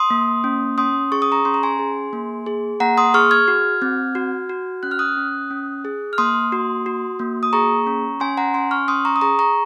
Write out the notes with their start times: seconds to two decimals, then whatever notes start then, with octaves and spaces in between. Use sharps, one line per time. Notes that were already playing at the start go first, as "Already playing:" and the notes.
Already playing: C6 D#6
0.10 A#3
0.44 C#4
0.78 C#4 C6 D#6
1.12 G#4 C#6
1.22 D#6
1.32 A#5 C#6
1.45 C#4 C6
1.54 A#5
1.63 G#5 C6
1.79 G#4
2.13 A#3
2.46 G#4
2.80 A#3 F#5 A#5
2.98 C6 D#6
3.14 G#4 C#6 F6
3.31 F6 G#6
3.48 F#4
3.82 C4
4.15 F#4
4.49 F#4
4.83 C#4 F#6
4.91 F6
4.99 D#6 F#6
5.17 C#4
5.51 C#4
5.85 G#4
6.13 F6
6.18 A#3 C6 D#6
6.52 F#4
6.86 F#4
7.19 A#3
7.43 D#6
7.53 G#4 A#5 C#6
7.87 C#4
8.20 C#4 G#5 C6
8.37 F#5 A#5
8.54 C#4 G#5 C6
8.71 C#6 F6
8.88 C#4 C6 D#6
9.05 A#5 C#6
9.16 D#6
9.21 G#4 A#5 C#6
9.39 A#5 C#6